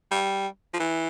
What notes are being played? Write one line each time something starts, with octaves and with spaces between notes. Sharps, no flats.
G3
F3
E3